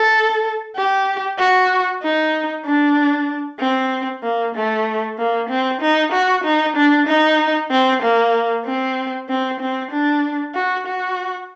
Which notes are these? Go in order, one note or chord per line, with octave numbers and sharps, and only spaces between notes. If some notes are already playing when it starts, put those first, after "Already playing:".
Already playing: A4
G4
F#4
D#4
D4
C4
A#3
A3
A#3
C4
D#4
F#4
D#4
D4
D#4
C4
A#3
C4
C4
C4
D4
F#4
F#4